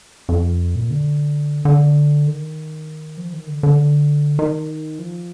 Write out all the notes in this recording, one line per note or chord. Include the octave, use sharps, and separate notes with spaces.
F2
A#2
D3
D3
D#3
F3
D#3
D3
D3
D#3
F3